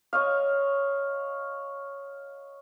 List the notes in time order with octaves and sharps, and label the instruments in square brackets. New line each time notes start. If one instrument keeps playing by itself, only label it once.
[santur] C#5 D#5 F5